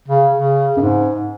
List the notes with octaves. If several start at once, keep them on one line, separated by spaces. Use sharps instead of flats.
C#3
C#3
F#2
G#2